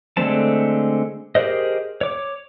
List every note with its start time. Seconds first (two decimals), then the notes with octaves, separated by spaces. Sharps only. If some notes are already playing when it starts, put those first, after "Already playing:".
0.17 D3 G#3 A3 C4 A5
1.35 G4 G#4 A#4 C5 D#5
2.01 C#5 D6